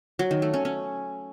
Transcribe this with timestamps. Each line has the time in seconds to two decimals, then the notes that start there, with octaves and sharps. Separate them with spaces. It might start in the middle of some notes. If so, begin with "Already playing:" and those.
0.19 F#3
0.31 D#3
0.42 A3
0.54 C#4
0.65 C#4